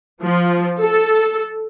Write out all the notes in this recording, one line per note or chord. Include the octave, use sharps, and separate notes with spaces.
F3
A4